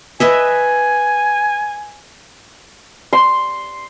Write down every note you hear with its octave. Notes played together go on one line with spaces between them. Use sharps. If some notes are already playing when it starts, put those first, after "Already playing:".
B4 D#5 E5 G#5
C6